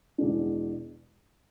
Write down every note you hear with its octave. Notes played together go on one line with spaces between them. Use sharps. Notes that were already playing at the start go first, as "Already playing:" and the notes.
E2 B2 G#3 D4